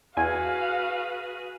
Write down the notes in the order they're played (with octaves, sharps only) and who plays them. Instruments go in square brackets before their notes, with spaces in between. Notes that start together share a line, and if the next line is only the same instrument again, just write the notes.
[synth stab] E2 G#5 [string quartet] F#4 G#4 B4 [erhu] F5